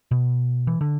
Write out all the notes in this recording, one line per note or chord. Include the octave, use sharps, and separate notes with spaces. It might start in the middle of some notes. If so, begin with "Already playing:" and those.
B2
E3
D3